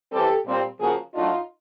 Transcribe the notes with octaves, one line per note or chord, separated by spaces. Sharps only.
E3 G3 C4 G4 A4
A#2 G3 C4
C#3 F3 A#3 F#4 G#4
A2 F#3 A3 D4 D#4 F4